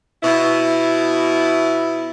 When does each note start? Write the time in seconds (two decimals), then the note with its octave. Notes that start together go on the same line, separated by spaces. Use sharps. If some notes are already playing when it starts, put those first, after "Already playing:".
0.23 B2 E4